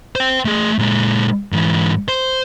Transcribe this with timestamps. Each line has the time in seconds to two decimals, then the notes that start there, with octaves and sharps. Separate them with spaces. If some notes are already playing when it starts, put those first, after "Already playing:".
0.15 C5 G5
0.45 A3 G#4
0.78 A#2 G#3
1.52 G#2 E3
2.08 C5